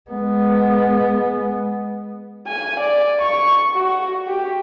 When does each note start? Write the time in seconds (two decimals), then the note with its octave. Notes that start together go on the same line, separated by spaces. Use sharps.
0.11 G#3 B3
2.47 G#5
2.80 D5
3.22 C#6
3.75 F#4
4.27 G4